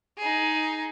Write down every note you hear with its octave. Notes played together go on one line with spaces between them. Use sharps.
D#4 G#4